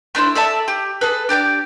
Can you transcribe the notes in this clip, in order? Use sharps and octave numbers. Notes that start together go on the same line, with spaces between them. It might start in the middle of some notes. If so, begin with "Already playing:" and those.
A3 D4 E4 C5
A4 D5 E5 A5
G4
G#4 A4 B4
D4 G4 A#4 D5